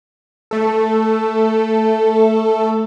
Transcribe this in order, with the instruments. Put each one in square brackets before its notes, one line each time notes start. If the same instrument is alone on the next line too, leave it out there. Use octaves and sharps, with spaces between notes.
[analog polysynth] A3 A4